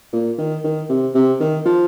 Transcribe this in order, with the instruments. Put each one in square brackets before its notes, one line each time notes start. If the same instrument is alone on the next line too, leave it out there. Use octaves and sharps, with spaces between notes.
[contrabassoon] A#2
D#3
D#3
C3
C3
D#3
F3